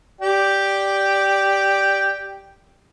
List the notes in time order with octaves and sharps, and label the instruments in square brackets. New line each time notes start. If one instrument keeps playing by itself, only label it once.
[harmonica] G4 D5 G5